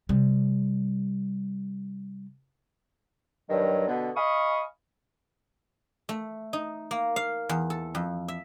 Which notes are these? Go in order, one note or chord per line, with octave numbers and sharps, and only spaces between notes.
C3 G3
G2 D#3 F#3
B2 D3 B3
D#5 F5 G#5 B5 C#6 D#6
A3
D#4
A#3
F5
E2
A4
F2
E5